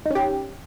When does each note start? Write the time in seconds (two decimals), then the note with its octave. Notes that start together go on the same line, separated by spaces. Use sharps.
0.06 D#4
0.10 C#4
0.15 G4